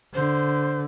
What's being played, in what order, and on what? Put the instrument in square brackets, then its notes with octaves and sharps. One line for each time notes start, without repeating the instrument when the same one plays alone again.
[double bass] D3 [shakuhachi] C5